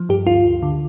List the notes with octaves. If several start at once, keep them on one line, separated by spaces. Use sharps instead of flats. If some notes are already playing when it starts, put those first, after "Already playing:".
Already playing: F3
G2 G4
D2 F4
D2
D3